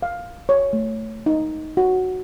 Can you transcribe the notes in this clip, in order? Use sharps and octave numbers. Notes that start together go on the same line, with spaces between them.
F5
C#5
A3
D#4
F#4